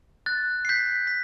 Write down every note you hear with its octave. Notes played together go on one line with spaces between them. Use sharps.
F#6 A6
C7
G6 B6
B6